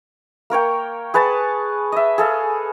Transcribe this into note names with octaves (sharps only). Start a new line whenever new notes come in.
A#3 A#4 C#5 G5
G#4 B4 C#5 A5
D#5 E5
G#4 A4 F5